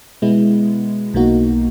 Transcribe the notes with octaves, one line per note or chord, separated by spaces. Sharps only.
B2 G#3 B3 E4
B1 B2 A#3 D#4 F#4